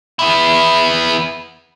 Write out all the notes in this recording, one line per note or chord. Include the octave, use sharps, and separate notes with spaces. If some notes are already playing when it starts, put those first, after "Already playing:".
B3 E4